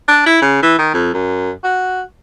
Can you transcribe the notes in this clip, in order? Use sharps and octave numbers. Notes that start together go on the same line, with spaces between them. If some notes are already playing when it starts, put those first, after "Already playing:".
D4
E4
C#3
E3
D#3
F2
F#2
F#4